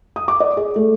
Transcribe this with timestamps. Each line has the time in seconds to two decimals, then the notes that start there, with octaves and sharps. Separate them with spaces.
0.16 D#6
0.28 D6
0.40 D5
0.57 G#4
0.76 A3